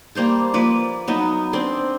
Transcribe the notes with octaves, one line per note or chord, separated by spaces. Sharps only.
G3 A#3 C5 A5
F3 A#3 B4 D5
F#3 B3 D#4
C4 D4 D5 C6